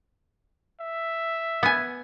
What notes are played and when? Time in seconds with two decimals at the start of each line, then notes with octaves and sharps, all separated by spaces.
0.80 E5
1.63 B3 G#5